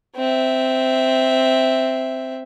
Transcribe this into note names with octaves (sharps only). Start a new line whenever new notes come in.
C4 E5